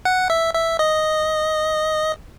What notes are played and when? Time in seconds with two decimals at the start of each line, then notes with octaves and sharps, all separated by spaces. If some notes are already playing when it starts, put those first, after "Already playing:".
0.05 F#5
0.30 E5
0.54 E5
0.79 D#5